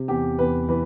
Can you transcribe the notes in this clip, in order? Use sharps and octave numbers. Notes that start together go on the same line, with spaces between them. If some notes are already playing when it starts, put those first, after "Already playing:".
Already playing: C3
E2 G4
E2 B4
E3 B4